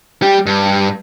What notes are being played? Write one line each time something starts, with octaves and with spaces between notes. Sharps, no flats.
G3 G4
G2